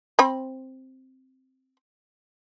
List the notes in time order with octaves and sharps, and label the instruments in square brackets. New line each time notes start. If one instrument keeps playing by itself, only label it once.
[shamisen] C4 B5